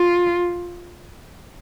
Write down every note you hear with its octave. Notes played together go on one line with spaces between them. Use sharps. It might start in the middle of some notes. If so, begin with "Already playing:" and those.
Already playing: F4